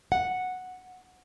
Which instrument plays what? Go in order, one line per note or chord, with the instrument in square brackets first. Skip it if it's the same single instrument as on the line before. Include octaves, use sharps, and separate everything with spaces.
[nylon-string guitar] F#5